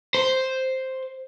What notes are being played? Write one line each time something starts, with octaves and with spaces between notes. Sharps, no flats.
C5